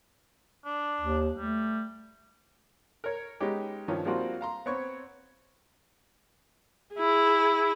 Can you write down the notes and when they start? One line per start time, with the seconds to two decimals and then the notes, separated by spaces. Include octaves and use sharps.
0.65 D4
1.01 D#2
1.38 G3 A3
3.04 A#4 C#5
3.40 G#3 B3 C#4 D#4 G4
3.88 G2 D#3 F3 C#4
4.05 F3 G3 A#3 C4 F4 F#4
4.41 F5 A#5 C6
4.66 B3 C4 C#5 C#6
6.95 E4 G#4